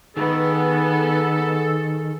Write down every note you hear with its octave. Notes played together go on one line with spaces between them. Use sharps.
D#3 B3 G#4 A4